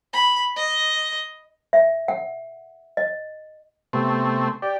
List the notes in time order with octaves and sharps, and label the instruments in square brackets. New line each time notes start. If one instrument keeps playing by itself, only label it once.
[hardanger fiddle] B5
D#5
[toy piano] E5
F#5
D#5
[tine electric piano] C3 B3 [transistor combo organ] A3 C4
[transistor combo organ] G4 [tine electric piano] D5